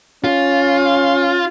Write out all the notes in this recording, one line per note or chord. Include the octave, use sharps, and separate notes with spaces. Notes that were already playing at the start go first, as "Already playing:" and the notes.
C#4 F4